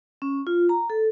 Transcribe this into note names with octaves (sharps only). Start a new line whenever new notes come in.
C#4
F4
A#5
A4